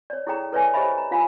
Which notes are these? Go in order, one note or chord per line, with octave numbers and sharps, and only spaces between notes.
C#5 D5
E4 G#4 A4 C#5 G5 A#5
A4 B4 C#5 D5 E5 G#5
G4 C5 C#5 D#5 E5 B5
A#5
F4 F5 G#5 B5